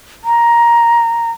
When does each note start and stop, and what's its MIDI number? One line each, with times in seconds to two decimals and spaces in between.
0.24 1.31 82